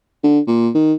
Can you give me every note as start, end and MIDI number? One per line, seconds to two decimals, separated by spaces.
0.23 0.40 50
0.47 0.69 46
0.74 0.93 51